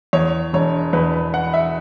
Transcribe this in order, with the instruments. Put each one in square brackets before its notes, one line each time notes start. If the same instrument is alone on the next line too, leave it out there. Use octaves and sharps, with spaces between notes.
[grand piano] E2 C#5
E1 C#5
E2 B4
B5
E3 F#5
E5